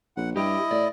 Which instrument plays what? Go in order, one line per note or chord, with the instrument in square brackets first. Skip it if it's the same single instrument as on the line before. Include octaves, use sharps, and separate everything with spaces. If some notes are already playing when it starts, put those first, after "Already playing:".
[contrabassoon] A#1 [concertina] F#5
[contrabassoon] G2 [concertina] E4 D#5 [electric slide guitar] G4
[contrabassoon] A2 [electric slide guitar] D5